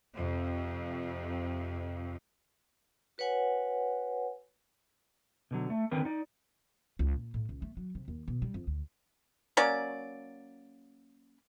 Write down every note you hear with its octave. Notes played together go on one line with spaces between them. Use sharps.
F2 C3
F#4 B4 C#5 F#5 G#5
B2 D3 F#3
A3
D3 D#3 C4 A#4 B4
D#4 D5
C#2
A#2
A2
C#2
A3
F#3
C3
D#2
B2
G3
F2
D2
F#3 A#3 C#4 D5